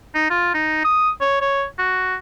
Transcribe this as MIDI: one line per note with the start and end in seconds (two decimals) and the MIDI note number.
0.15 0.30 63
0.30 0.54 65
0.54 0.85 63
0.85 1.10 87
1.21 1.39 73
1.41 1.64 73
1.79 2.16 66